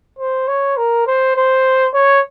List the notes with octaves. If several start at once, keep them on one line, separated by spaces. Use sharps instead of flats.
C5
C#5
A#4
C5
C5
C#5